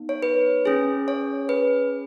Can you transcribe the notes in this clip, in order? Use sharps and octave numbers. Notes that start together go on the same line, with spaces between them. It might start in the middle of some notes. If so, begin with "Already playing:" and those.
Already playing: B3 D#4
C#5
B4
C#4 G#4
C#5
B4